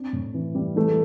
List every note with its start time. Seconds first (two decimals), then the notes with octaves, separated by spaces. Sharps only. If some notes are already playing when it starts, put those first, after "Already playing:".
Already playing: C4 D4
0.13 A2
0.34 E3
0.55 G3
0.76 E3 A3